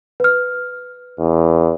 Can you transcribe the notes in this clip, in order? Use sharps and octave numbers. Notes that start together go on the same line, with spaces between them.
B4 F6
E2